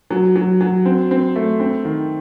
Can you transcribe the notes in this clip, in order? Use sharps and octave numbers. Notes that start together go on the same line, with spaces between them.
F#3
F#3
F#3
C4
C4
A3
C4
D#3